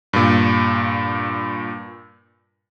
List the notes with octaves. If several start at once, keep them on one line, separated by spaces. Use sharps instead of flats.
G2 A#2